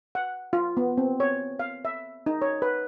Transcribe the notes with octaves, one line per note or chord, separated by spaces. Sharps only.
F#5
F4
B3
C4
C#5
F5
E5
D#4
C#5
B4